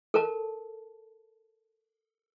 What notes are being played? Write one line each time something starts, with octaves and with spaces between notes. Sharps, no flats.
A4 A#4 A5